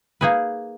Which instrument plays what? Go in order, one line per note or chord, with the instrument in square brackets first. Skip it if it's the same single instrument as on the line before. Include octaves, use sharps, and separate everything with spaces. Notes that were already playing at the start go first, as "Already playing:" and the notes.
[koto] A#3 D#4 G#4 B4